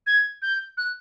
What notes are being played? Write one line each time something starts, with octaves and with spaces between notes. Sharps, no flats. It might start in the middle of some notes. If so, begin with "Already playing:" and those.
G#6
G6
F#6